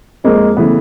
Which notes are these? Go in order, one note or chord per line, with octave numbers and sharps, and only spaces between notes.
F2 G#3 A#3
C#3 E3 A3 B3